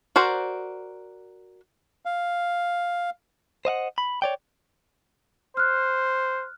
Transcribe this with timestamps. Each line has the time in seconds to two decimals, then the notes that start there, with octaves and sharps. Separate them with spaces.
0.16 F#4 A#4 C5 D5
2.05 F5
3.65 C5 D#5 F5 F#5
3.98 B5
4.22 C#5 D5 G5
5.57 C5 F6 F#6